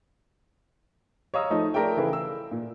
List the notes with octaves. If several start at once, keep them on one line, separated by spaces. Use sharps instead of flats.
C#5 D#5 F5 A#5 D#6 E6
F3 A3 D#4 D#6
A3 A#4 D5 E5 G5
C#3 E3 E4 G#4 A4 B4
E6
A#2